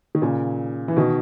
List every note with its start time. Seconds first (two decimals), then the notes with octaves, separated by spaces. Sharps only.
0.15 D#3
0.22 A#2 C#3
0.88 E3
0.97 B2 D#3